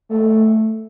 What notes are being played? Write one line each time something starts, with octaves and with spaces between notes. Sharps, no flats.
A3